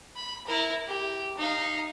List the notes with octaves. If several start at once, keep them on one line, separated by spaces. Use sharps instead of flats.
B5
E4 A#4
G4
D#4 F5